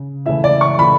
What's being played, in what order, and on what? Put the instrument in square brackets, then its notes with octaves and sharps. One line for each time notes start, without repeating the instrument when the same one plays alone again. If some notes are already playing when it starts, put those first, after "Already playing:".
Already playing: [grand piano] C#3
[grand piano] C#3 E3 A3 E4 [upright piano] E5
[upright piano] D5
C#6
[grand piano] C#3 E3 A3 E4 [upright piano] B5